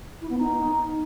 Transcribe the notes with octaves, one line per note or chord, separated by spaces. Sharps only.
E4
B3
D#4